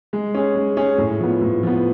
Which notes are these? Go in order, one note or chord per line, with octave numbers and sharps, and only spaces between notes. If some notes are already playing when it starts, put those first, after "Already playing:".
G#3
C#4 G#4
G#3
C#4 G#4
A2
F3 B3
A2
F3 B3